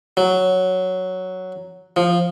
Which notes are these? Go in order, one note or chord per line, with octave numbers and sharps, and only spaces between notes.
F#3
F3